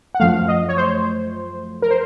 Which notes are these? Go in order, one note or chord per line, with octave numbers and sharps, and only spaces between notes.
F#5
F#2 F3 A3 F5
D#5
C#5
C5
A#4
C5